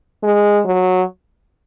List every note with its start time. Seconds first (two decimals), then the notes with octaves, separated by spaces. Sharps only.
0.24 G#3
0.65 F#3